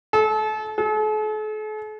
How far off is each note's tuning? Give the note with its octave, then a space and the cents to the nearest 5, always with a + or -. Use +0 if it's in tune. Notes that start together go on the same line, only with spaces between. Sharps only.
A4 -35
A4 -45